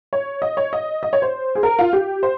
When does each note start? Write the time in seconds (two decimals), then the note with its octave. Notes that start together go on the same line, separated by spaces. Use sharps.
0.13 C#5
0.42 D#5
0.57 C#5
0.73 D#5
1.03 D#5
1.13 C#5
1.22 C5
1.55 G#4
1.63 A#4
1.79 F4
1.93 G4
2.23 C5